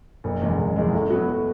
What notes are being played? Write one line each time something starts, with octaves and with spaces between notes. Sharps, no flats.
F#1
E2 C#3 G#3
F#1
E2 C#3 G#3
A2
F#3 B3 F#4
A2